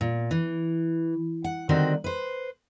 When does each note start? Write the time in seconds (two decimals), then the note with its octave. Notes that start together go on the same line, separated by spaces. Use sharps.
0.01 A#2
0.31 E3
1.44 F#5
1.69 D3 D#3 G3 C4 F#4
2.04 B4 C5